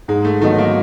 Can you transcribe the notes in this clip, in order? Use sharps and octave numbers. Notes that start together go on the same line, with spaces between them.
G#2 G#3
A3
D#3 F#3 A3 B3 D#4
A#3